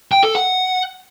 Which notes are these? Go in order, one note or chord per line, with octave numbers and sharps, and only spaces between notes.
G5
A4
F#5